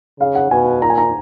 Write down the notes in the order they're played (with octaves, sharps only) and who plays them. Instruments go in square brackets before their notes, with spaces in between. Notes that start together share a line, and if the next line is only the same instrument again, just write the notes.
[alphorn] C#3 [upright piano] F5
[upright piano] F#5
[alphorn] B2 [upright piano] G#5
[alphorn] A#2 [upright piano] A#5
[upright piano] G#5
A#5